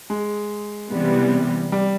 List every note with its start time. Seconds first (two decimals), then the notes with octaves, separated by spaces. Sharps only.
0.10 G#3
0.91 C3 E3 G3 B3
1.72 G3